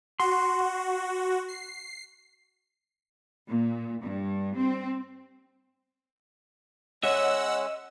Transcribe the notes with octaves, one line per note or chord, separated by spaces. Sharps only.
F#4 C6
C7
A#2
G2
C4
G#3 C#4 C#5 D#5 E5 F#5 E6